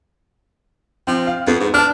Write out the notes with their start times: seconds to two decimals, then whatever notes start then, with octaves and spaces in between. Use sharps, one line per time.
1.07 F3 C4
1.27 F5
1.47 F2 B3
1.60 G#2
1.74 D4 A5 F6